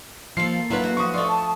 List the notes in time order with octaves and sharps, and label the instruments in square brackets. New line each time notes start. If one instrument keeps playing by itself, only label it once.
[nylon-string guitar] F3 [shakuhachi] A#3 [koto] F4 A4 [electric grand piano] C7
[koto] F#3 D4 F4 [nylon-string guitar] E4 B4
[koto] F#4
[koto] F3 F#4 [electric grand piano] C#6 D#6
[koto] A3 F4 [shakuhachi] D5
[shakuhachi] A5